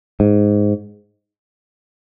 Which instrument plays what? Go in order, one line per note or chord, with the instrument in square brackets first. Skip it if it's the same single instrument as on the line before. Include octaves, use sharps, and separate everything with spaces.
[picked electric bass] G#2